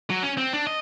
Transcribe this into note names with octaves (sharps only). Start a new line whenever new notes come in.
F#3
C#4
C4
D4
D#5